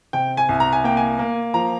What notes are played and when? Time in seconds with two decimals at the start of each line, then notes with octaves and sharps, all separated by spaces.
0.13 C3 G5
0.37 G#5
0.49 C2
0.60 A#5
0.73 G#5
0.84 A#3 G5
0.97 G#5
1.19 A#3
1.54 F3 A#5